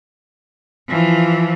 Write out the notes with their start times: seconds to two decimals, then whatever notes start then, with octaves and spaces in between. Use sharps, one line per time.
0.89 E3 F3